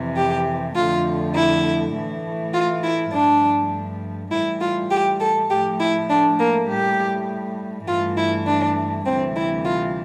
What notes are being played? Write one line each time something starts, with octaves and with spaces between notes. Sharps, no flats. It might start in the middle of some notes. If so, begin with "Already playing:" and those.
Already playing: F2 C3 E3
G4
F2 D3 F3 A3 F4
E4
A2 E3 A3
F4
E4
G2 F3 A3 D4
A2 E3 G3 E4
F4
G4
A4
A2 F3 A3 G4
E4
D4
A#3
A2 G3 G4
G2 E3 A3 F4
E4
D4
D2 C3 E3 G3 C4
E4
F4